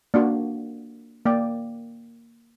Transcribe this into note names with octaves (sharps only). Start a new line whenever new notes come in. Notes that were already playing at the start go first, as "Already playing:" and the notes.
A#3 D4 F#4
A#3 D5 G5